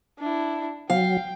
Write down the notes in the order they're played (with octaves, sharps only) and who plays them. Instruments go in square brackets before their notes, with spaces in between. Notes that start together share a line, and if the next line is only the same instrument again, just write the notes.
[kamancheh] D4 E4
[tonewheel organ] F#3 [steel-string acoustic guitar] F5 [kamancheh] G5